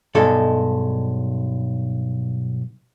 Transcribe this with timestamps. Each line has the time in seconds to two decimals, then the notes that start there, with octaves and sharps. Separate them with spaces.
0.15 B1 G2 G#3 A4